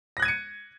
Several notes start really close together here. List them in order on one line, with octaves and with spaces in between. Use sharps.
A#6 F#6 G#6 D#7 C#7